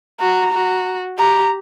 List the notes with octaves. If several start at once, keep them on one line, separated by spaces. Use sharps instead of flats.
F#4 A#5
F#4
G4 A#5